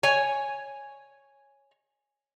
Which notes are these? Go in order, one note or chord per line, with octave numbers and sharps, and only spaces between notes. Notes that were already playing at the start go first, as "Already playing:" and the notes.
C#5 G#5